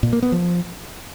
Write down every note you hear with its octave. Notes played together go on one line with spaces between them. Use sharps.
A#2
A#3
B3
F3